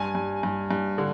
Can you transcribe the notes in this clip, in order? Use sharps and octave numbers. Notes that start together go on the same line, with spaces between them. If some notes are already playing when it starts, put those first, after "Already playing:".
Already playing: G2 G#5
G2
G2
G2
D3